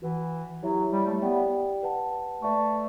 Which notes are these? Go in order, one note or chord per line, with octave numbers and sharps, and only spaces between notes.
E3 F#4 B4 F#5
F#3 E4 G4 C#5 E5
G3
A3
B3 G4 D5 G5
B4 F#5 A5
A3 B4 D5 A5 C#6